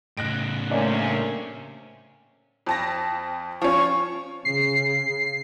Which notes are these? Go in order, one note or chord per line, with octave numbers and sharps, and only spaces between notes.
A2 C#3 F#6 A#6 D7
C3 A3 A#3 C#4 D4
F2 A5 A#6
F3 C#4 C#6
C#3 C7